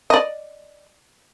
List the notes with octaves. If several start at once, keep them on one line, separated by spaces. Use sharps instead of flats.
D5 D#5